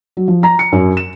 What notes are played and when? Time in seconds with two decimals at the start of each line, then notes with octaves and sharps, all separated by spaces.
0.17 F#3
0.28 F3
0.43 A#5
0.59 C#7
0.72 F#2
0.97 E7